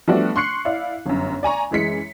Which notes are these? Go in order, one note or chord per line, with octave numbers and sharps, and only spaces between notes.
F3 G3 A3 B3 D4 F#4
C6 C#6 F#6 C7 C#7
E4 D5 F5
G1 F#2
D5 G#5 A#5 C#6
F#2 E3 G#3 B6 C#7